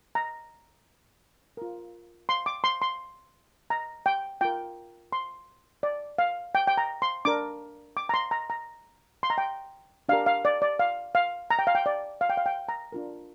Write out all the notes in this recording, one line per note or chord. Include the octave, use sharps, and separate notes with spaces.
A#5
F4 A#4
C6
D6
C6
C6
A#5
G5
F4 A#4 G5
C6
D5
F5
G5
G5
A#5
C6
D4 A#4 D6
D6
A#5
C6
A#5
A#5
C6
A#5
G5
D4 G4 A#4 F5
F5
D5
D5
F5
F5
A#5
G5
F5
G5
D5
F5
G5
F5
G5
A#5
D4 F4 A#4